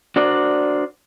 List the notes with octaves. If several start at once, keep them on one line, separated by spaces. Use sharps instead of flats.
D4 F#4 A#4 C5 D5